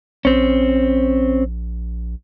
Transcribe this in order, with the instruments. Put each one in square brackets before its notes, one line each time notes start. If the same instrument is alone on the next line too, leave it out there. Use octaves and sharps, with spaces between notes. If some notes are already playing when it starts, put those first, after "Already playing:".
[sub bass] A#1 [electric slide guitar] C4 C#4